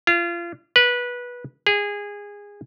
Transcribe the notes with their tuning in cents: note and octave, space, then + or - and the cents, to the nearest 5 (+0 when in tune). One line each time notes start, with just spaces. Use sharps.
F4 -30
B4 -15
G#4 -20